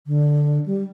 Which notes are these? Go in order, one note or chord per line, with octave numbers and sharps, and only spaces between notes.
D3
G3